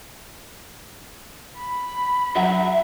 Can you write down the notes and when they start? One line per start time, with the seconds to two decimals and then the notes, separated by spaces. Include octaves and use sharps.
1.58 B5
2.35 F#3 F#4 E5